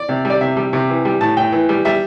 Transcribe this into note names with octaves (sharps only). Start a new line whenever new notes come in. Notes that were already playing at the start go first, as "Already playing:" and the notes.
Already playing: D5
C3
G3
D5
C3 E5
G3
C3
E3
G3
A2 A5
A2 G5
E3
G3
G3 E5